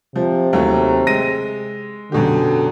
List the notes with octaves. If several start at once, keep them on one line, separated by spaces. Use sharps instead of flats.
C3 F3
D#2 F#3 A3
G#3 A#6 D#7
F#2 B2 D3 G4